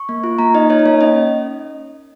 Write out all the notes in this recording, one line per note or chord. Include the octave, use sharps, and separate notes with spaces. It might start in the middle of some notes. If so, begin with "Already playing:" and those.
Already playing: C#6
A#3
F4
A#3 A#5
D#4 D#5
D#4 C#5
D#5
A#3 C#5
C#4 D#5